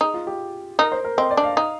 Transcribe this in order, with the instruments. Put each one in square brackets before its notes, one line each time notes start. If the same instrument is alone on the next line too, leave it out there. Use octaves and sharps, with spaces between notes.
[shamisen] D#4 [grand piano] G#4
[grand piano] F4
G4
[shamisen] D#4 [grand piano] A#4
[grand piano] C5
A#4
[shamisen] C4 [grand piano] D#5
[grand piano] D5
[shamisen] D4
[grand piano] F5
[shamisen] D#4